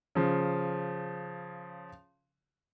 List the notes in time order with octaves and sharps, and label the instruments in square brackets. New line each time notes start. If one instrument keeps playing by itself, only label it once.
[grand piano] C#3 F3